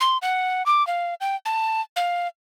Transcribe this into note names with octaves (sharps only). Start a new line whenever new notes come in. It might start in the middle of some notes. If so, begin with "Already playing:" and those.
C6
F#5
D6
F5
G5
A5
F5